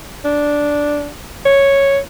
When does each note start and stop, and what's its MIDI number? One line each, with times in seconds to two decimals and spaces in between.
0.25 1.10 62
1.46 1.99 73